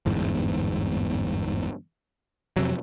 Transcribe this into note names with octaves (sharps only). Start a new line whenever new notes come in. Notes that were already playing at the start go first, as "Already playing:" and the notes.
G1 E2 G#2
F2 C3 F#3